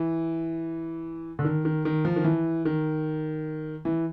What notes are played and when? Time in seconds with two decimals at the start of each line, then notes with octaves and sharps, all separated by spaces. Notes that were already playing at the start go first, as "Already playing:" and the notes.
Already playing: E3
1.39 D3
1.44 D#3
1.65 D#3
1.85 D#3
2.05 F3
2.16 D#3
2.24 E3
2.65 D#3
3.85 E3